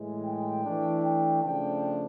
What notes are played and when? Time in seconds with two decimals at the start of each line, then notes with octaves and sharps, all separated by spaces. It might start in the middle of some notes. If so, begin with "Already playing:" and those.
Already playing: A2 E3 G#3
0.23 G5
0.64 E3 A3 D4
1.03 G5
1.43 C#3 F3 A3 D4 G5